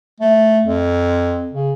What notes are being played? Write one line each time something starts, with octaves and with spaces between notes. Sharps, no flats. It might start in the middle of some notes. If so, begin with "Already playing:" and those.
A3
F2
C#3